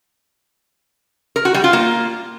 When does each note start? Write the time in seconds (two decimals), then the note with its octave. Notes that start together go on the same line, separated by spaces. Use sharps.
1.36 A#4
1.45 F#4
1.54 G3
1.64 F4
1.73 A#3